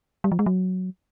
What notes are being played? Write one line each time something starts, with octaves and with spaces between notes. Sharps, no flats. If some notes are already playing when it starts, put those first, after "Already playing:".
G3
F3
G#3
F#3